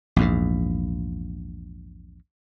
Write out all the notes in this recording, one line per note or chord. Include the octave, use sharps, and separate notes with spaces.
A#1 E2 G#2